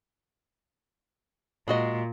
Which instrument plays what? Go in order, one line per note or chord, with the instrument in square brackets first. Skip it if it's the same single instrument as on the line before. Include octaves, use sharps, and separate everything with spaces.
[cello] A#2 [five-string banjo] G#3 F#4 D#5